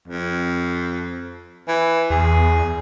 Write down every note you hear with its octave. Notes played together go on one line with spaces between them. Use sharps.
F2
E3
E2 G#4